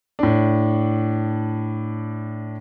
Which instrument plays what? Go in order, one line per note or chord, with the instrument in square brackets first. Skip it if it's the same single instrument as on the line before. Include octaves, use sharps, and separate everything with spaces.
[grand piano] A2 D4